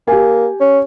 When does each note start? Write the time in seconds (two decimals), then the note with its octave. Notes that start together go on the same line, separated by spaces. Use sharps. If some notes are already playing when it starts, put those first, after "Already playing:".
0.08 A#3 G4 G#5
0.61 C#4